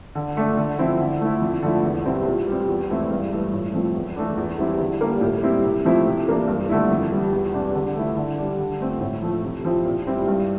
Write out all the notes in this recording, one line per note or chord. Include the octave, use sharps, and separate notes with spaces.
D3
A3 D4
D3
F3 C4 E4
D3
A3 E4
F2
D3 F3 A3 E4
E2
C3 G3 C4 E4
A#2
G3 C4
E2
E3 A3 C4 E4
G2
E3 A3
A2
F3 A3 C4
E2
E3 A3 D4
E2
E3 G3 C4 E4
D3
G3 A#3 D4
A2
G3 C4 E4
C3
F3 A3 C4 E4
C3
E3 A#3 D4
G2
D3 A3 E4
F2
E3 G3
E2
C3 G3 D4
D3
A3 E4
D3
G3 D4
D3
A3 C4
A2
F3 A3
C3
F3 C4 E4
A#2
G3 C4 E4
G2